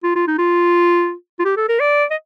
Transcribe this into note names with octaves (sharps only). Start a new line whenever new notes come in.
F4
F4
D#4
F4
F4
G4
A4
A#4
D5
D#5